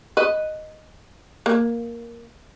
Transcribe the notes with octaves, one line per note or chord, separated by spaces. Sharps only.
B4 D#5
A#3